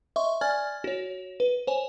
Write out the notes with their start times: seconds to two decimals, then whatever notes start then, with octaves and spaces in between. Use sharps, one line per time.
0.16 D#5 E5 C6 C#6
0.41 D5 G#5 F6 G#6 A6
0.84 F#4 C#5
1.40 B4
1.67 C5 C#5 G#5